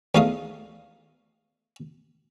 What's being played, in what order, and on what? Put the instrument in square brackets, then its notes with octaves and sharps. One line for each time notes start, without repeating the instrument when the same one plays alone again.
[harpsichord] E2 A3 D#4 F5 D#6